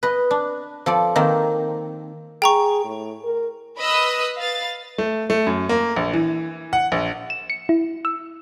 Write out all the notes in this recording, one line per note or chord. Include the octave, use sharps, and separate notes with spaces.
B4 D#5
D4
F3 A4 D5
D#3 A#3 C4
G#4 G5 A#5 C#6
A2
A#4
B4 D#5 B5 D#6 E6 F#6
B4 F5 A6
A3
A3
F#2
A#3
A#1
E3
F#5
A#1
E7
C#7
E4
E6